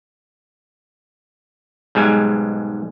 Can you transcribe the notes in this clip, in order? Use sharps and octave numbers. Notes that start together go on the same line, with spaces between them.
B1 G#2 G3 G#3 G#5